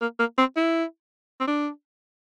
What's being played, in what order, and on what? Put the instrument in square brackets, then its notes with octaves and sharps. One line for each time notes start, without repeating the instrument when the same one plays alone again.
[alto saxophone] A#3
A#3
C4
E4
C4
D4